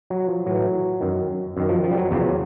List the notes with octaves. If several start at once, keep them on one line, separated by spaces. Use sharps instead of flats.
F#3
F3
A2 E3 F#3
F#2 D#3
F#2 D#3
F3
F3
G3
F#3
E2 C#3 F3 F#3